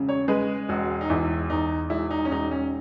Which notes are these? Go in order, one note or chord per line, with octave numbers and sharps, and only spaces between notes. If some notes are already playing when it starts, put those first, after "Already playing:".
Already playing: E1 C#3
C#5
G#3 B4
E1 F#4
D#4
E2 E4
E2 D#4
E1 E4
D#4
C#4
E1 D#4
C#4